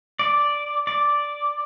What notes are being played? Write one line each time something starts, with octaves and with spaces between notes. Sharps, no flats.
D5
D5